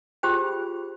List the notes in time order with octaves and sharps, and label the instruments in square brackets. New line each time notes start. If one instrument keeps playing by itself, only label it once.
[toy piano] F4 G4 G#4 C5 G5